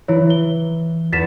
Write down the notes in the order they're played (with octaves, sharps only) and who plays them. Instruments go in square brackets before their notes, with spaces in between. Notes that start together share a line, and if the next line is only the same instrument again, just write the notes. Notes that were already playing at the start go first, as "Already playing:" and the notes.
[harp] E3 [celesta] E4 C#5
[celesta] G7
[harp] E2 [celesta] A6 B6 E7